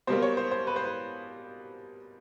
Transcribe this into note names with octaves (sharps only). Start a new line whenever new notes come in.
B2 G3 A#3 C5
C#5
C5
C5
B4
C5
B4